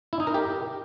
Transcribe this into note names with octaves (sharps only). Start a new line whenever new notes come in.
E4
D#4
A#4
G4